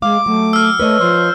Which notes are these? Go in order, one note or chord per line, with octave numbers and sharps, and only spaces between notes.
G#3 F5 D6
F#3 A3
E6 F6
A3 B4 C#5 D#5
F3 C5